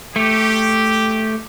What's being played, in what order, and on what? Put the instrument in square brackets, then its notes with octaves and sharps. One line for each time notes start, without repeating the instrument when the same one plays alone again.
[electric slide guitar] A3 [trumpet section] G4